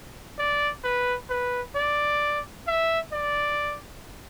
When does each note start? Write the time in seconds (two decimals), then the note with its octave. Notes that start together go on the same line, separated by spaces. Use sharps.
0.38 D5
0.84 B4
1.29 B4
1.76 D5
2.67 E5
3.12 D5